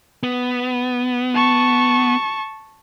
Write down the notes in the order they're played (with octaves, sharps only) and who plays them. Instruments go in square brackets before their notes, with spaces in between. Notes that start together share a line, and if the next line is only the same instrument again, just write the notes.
[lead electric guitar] B3
[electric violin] A5 C#6